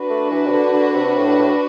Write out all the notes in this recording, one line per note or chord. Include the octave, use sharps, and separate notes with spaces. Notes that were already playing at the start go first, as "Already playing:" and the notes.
Already playing: D4 F#4 B4
A3
E3
C3
D3
D3
C3
A2
A2